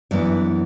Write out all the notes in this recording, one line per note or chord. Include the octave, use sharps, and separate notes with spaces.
F#2 E3 B3 D4 D5